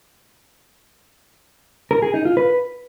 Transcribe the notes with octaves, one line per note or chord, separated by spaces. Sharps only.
A#4
G#4
D#4
F4
B4